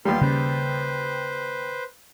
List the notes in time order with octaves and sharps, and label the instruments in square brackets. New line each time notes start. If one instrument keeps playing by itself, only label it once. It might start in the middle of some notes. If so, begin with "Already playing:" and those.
[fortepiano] D#2 G3 [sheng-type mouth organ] B3 F4 C6
[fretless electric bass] C#3 C#4 [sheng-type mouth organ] B4 C5